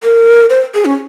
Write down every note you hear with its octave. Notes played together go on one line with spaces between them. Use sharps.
A#4
C5
G#4
C#4